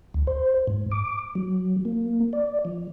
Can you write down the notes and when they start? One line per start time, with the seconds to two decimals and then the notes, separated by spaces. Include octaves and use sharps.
0.14 D2
0.27 C5
0.67 G#2
0.91 D6
1.35 F#3
1.85 A#3
2.33 D5
2.65 F3